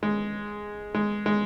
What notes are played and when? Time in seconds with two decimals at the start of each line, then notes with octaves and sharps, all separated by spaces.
0.03 G#3
0.94 G#3
1.26 G#3